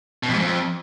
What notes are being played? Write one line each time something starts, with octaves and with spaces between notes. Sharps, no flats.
B2
F2
G#2
F2